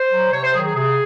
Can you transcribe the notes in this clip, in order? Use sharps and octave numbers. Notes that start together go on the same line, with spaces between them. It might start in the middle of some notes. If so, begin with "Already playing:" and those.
Already playing: C5
F#3
C3 C#5
C5
D#3 F#3 G#4
G#4
C3 G#4